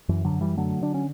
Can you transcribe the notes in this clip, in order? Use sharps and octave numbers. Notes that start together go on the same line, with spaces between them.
F#2 E3
D3 F#3
F#2
E3 G3
D3 F#3 A3
D3 D4
C#4